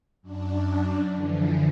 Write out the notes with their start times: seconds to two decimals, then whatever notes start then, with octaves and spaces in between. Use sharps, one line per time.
0.22 F#2 D4
1.14 D3 E3 F3